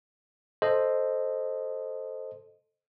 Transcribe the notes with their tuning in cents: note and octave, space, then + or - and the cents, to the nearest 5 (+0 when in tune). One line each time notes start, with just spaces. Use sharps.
A4 +0 C5 +0 D#5 -10